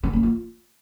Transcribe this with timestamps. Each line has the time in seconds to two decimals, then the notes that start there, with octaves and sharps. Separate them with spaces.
0.03 C#4
0.13 A#3
0.23 F4